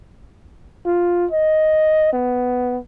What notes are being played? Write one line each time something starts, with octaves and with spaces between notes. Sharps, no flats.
F4
D#5
B3